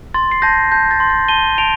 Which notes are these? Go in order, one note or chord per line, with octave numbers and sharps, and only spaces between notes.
C6 A6
C7
A5 G6 A#6
A5 G6
A6
C6
A6
A5 D#7 G7
A5 D7 F7